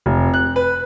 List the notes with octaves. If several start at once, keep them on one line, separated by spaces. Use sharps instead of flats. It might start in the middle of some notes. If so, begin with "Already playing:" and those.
F1
F#6
B4